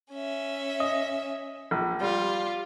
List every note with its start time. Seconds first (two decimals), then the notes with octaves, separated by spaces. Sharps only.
0.12 C#4 E5
0.80 D#5
1.71 A#1
2.01 G3 F4 G4